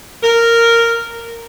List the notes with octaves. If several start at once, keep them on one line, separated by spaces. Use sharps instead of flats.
A#4